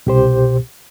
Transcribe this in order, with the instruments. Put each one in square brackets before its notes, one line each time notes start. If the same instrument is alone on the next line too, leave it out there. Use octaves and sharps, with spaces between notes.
[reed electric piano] C2 G4 C5 [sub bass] B2